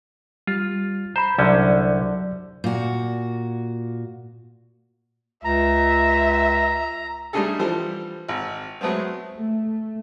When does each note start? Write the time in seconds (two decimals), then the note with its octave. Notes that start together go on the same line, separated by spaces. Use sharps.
0.47 G3 F4
1.16 C5 A#5 B5
1.38 C2 D3 F#3 C#4 D5 G6
2.64 A#2 F#4
5.45 C#2 E5 A#5
7.33 G3 A3 D4 D#4 G#4 A4
7.59 E3 F3 G3 A4 C5
8.29 G#1
8.81 F#3 G#3 A3 B3 C4
9.35 A3